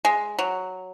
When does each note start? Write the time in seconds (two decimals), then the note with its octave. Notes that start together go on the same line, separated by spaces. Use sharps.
0.05 G#3
0.39 F#3